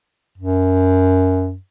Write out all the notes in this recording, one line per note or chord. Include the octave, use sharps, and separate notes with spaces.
F#2